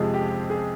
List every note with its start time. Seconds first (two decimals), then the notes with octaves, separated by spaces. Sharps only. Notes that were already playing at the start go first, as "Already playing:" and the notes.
Already playing: F2 C3 F3 G#3 G#4
0.14 G4
0.50 G#4